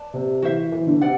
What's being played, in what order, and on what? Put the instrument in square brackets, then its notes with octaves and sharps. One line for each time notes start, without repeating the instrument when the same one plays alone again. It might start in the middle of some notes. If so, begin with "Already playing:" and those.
Already playing: [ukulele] B4 D5 A5
[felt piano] C3
[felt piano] E3 [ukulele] F#4 C5 E5
[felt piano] E3
D3
[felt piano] C3 [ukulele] D5 F#5